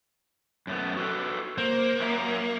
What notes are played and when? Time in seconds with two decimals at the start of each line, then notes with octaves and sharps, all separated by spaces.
0.67 F#2 A3 B3
0.97 F#4 A4 B4
1.58 A#3 C5
2.01 F#3 E5 A#5